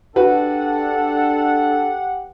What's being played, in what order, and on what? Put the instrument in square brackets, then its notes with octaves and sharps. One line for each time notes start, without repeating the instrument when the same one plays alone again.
[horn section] D4 A4 [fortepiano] F#4 B4 [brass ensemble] G4 F#5